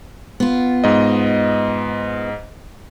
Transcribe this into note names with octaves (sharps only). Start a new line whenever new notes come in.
B3 F4
G#2 D#5